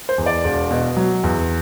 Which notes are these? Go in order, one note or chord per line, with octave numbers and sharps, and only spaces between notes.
C5
E2
D5
E1
B2
F#3
E2